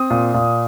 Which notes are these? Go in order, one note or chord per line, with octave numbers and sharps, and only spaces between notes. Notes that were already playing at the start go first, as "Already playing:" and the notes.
Already playing: C4 D#6
A#2
A#2